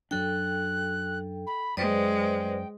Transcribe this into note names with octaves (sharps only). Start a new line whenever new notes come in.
F#2 F#3 D4 A4 G5 F#6
B5
F#2 G#3 B4 C5 D5 G5